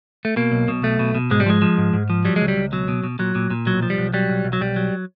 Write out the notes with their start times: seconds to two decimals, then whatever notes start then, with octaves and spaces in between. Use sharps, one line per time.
0.25 A3
0.36 B2 A#3
0.52 B1
0.68 B2
0.83 B1 A3
0.99 B2
1.15 B2
1.31 G#2 G#3
1.40 G3
1.46 F3 G#3
1.62 F3
1.78 G#2
1.93 G#2
2.10 F3
2.25 F#3 G3
2.36 C#2 G#3
2.48 G3
2.56 C#2
2.72 B2 F#3
2.88 B2
3.03 B2
3.19 A#2 F#3
3.35 A#2
3.50 A#2
3.66 B1 F#3
3.83 F3
3.90 G3
3.98 B1
4.13 F#3 G3
4.30 B1
4.44 B1
4.53 F#3
4.61 B1 G3
4.76 F#3